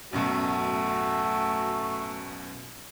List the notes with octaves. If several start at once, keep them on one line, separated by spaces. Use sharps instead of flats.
A1 F#2 B2 A3 F#4